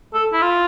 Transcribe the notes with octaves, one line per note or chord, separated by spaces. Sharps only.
A4
E4
F4